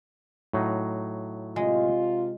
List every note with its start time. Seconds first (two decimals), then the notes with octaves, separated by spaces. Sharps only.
0.53 A2 F#3 D#4
1.56 C3 G#3 F4